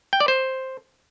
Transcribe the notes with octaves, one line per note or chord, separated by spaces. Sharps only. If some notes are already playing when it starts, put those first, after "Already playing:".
G5
D5
C5